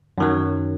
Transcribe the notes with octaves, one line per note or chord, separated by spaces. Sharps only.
F#2 D#3 F#3